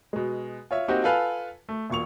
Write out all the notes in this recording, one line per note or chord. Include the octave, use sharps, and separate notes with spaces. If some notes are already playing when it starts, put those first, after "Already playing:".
B2 G#3
F4 C#5 E5
A#3 C4 D#4 F#4 G4
F4 A4 B4 F5 G#5
A3
E1 A#2 C#6 F7